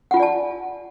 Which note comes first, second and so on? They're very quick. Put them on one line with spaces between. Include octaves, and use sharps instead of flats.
F#5 F4 G#5 D5 A5